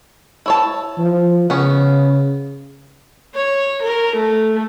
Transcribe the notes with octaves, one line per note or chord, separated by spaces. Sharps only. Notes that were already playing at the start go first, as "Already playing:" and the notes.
E4 C#5 A5
F3
C#3 B3 C#4
C#5
A#4
A3